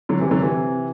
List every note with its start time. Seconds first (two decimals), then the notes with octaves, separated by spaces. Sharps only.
0.09 D3 F#3
0.20 C3 E3
0.31 D3 F#3
0.41 C3 E3